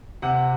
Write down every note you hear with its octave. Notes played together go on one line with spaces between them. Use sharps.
C3 F#5